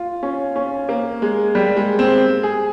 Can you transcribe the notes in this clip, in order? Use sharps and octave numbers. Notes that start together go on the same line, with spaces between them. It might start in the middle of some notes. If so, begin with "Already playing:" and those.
Already playing: F4
C#4
C#4
A#3
G#3
G3
G#3
C4
G#4